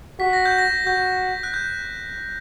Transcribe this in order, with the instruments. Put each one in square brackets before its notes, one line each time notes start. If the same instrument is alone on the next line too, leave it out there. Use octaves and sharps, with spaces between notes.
[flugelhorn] F#4 [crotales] B6
[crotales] A#6
G6
A#6
[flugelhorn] F#4 [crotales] G6
[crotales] F#6
G6